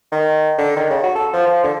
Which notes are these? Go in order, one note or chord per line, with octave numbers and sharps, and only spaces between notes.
D#3
D3
D#3
C#3
F#4
A4
F3
F3
D3